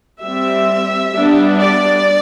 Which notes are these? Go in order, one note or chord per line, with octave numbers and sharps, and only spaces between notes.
G3 C4 E5
G3 B3 D4
D5